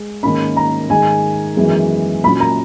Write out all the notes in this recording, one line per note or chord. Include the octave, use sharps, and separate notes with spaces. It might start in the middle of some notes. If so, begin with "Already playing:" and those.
Already playing: G#3
G#2 D#3 A#3 C#4 B5
A#5
G#2 D#3 G#3 G#5
F#2 E3 G#3 B3
A#2 F#3 C#4 B5
A#5